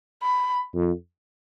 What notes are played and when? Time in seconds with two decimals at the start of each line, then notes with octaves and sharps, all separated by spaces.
0.22 B5
0.74 F2